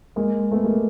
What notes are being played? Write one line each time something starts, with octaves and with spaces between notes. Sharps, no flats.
G#3 A#3
A3 B3
G#3 A#3